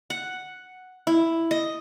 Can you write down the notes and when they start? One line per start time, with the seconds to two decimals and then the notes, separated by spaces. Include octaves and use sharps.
0.10 F#5
1.07 E4
1.51 D#5